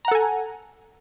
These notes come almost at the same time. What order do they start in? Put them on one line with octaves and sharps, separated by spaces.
A#5 F#5 A4 G#5